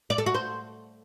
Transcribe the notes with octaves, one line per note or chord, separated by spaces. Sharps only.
D5
A4
F#4
C5